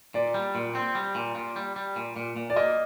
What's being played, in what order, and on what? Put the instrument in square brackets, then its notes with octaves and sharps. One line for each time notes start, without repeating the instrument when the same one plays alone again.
[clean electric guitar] A#2 [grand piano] D5
[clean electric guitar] G3
A#2
C4
G3
A#2
A#2
G3
G3
A#2
A#2
A#2
[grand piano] D5
[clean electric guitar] A#3 [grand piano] D#5